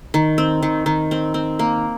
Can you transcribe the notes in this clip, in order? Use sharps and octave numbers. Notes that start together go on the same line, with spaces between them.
D#3
C4
D#3
D#3
C4
C4
A#3